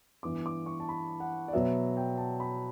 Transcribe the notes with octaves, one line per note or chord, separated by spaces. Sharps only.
G2 E3 B3 D6
D6
C#6
A5
B5
F#5
D5
B2 F#3 B3 E5
G5
A5
B5